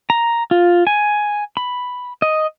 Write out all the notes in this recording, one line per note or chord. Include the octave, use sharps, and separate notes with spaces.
A#5
F4
G#5
B5
D#5